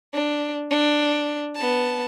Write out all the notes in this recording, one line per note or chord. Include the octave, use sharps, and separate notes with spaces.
D4
D4
B3 A5